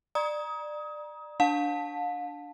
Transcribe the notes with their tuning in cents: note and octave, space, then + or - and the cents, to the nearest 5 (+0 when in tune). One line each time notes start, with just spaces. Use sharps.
D5 +25 A#5 +30 D#6 +25
D4 +0 F5 +40 A5 +0